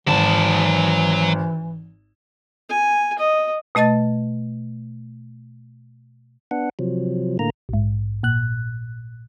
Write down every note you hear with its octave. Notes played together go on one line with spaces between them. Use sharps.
G#1 E3 F#3 A5
G#5
D#5
B2 A3 D#5 A5 A6
B3 D4 F#5
C3 F3 F#3
A2 D3 A#3 A#5
A#1 G#2
A#2 F#6